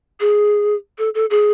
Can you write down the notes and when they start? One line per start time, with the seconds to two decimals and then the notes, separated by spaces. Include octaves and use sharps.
0.20 G#4
0.98 A4
1.15 A4
1.30 G#4